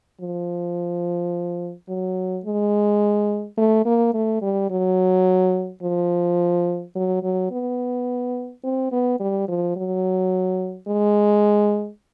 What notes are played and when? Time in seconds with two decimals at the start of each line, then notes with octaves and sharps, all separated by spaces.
0.21 F3
1.89 F#3
2.45 G#3
3.57 A3
3.85 A#3
4.14 A3
4.42 G3
4.70 F#3
5.82 F3
6.95 F#3
7.23 F#3
7.51 B3
8.64 C4
8.92 B3
9.20 G3
9.48 F3
9.76 F#3
10.88 G#3